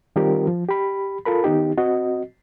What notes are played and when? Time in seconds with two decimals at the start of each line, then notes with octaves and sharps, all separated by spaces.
0.16 D#3 G3 C4 F4 G4 A#4
0.47 F3
0.68 G4 B5
1.25 F4 A4 A#4 B5
1.44 D#3 B3 D#4 G4
1.78 C4 F#4 D#5